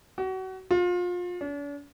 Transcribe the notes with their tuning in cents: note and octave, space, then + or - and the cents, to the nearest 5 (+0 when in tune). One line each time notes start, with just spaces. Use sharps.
F#4 +30
F4 +30
D4 -45